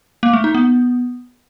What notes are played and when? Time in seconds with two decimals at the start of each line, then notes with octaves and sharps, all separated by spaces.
0.23 A#3
0.33 A3
0.44 D#4
0.55 B3